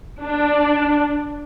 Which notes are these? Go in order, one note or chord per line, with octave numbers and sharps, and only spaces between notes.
D4